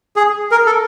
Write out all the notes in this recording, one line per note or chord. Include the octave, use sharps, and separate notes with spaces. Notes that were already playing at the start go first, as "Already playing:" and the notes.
G#4
A#4
A4